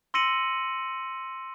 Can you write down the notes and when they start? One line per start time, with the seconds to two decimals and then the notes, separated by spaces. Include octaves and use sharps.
0.14 C6 E6 A#6 C#7 D#7 F#7